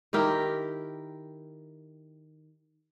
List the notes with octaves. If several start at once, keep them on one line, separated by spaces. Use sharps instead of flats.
D#3 E4 G4 A#4